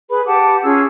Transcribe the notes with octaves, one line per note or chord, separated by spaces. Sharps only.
G#4 B4 B5
G4 F#5 A5 D6
C#4 F4 G#4 E6